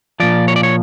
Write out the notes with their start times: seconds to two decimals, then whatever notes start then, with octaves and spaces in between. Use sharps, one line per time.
0.20 A#2 F3 D5
0.48 C#5
0.56 D5
0.63 C#5